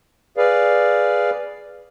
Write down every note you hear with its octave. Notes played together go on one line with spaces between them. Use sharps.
G#4 B4 D5 F5